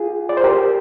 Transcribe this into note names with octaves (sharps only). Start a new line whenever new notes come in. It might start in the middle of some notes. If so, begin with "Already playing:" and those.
Already playing: F4 G#4
D5
C5
G4 A#4